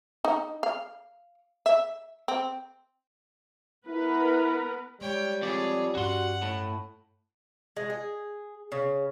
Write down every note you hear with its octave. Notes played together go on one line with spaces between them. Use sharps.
D#4
F5
E5
C4
B3 E4 A#4 B4
G3 G#3 C#5 G5
F2 G#4 C#5 D5
G2 C#4 F#4 F#5 C6
A2
G#3
G#4
C#3